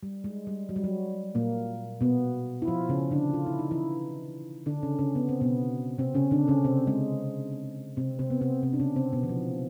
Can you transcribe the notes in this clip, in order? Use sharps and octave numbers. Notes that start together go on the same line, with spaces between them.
G3
G#3
G3
F#3
G3
F#3
A#2 A#3
B2 B3
E4
F3 F4
C#3 C#4
D3 D4
F4
E4
D#4
E3 E4
D3 D4
C#3 C#4
C#3 C#4
B3
C4
B2 B3
C3 C4
C#3 C#4
D3 D4
C#3 C#4
C3 C4
G#3
C3 C4
C3 C4
B3
C3 C4
C3 C4
D4
C#3 C#4
C3 C4
B2 B3
E3
F3